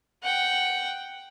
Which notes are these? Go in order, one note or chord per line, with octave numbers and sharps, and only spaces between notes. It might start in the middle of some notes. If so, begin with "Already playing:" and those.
F#5 G5